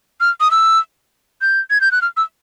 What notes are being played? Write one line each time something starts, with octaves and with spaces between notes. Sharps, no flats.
F6
D#6
E6
G6
G#6
G6
F#6
F6
E6